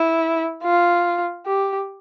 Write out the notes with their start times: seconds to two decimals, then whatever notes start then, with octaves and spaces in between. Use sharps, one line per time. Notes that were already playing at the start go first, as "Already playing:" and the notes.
Already playing: E4
0.63 F4
1.46 G4